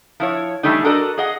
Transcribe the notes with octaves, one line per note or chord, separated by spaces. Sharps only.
F3 E4 C#5
E3 G3 A3 D4 D#4
D4 F#4 A4 A#4 D5 D#5
G#4 D#5 F#5